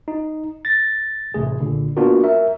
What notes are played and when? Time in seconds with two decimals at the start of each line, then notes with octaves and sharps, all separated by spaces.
0.08 D#4
0.65 A6 A#6
1.34 A1 C3 A3 G#4
1.61 B1 A#2 D3
1.97 A#3 B3 D4 F4 F#4 A#4
2.24 A#4 E5